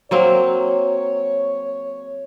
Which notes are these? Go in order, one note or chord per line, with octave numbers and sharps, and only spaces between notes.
F#3 A#3 C4 C#5